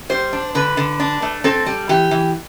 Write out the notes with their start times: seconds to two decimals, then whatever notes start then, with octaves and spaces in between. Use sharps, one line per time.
0.09 G3 C5
0.33 D4
0.55 D3 B4
0.77 D3
1.00 D4
1.22 A3
1.44 C4 A4
1.66 G3
1.89 E3 G4
2.11 E3